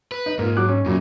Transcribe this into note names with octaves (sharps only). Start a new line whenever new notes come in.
B4
D#4
G#2 A#3 F4
F#3 D6 F#6
C#4
F#2 A#2 C#3 F#3